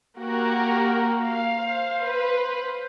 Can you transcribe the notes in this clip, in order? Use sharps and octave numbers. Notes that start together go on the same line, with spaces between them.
A#3 F#4 G4 A#4
F5
C5
B4 F5